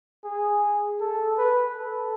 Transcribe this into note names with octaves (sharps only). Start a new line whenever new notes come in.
G#4
A4
B4
A4